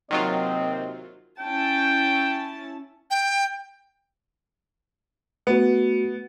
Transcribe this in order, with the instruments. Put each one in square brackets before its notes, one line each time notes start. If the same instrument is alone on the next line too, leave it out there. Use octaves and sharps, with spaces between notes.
[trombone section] D#2 C3 C4 [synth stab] D#3 F#3 F4 [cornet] D#5
[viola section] C#4 E4 A5 [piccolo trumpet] G5
[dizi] G5
[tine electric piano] A3 F#4 [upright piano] B3